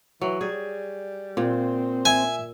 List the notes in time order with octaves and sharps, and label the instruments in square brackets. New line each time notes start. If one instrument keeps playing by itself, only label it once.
[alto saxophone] E3 [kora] F#3
[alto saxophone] G3 [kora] G#4
[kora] A#2 [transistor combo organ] C4
[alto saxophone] E5 [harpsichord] G#5